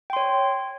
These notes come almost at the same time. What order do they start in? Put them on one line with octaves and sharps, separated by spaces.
G5 C6 C#5